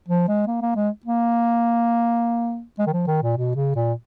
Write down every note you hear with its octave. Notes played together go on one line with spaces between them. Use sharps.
F3
G#3
A#3
A#3
G#3
A#3
G#3
D#3
F3
D#3
A#2
B2
C#3
A#2